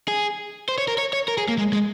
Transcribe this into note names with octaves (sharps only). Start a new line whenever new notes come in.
G#4
C5
C#5
A#4
C#5
C#5
A#4
G#4
A#3
G#3
G#3